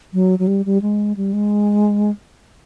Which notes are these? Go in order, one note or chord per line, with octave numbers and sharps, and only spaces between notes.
F#3
F#3
G3
G3
G#3
G3
G#3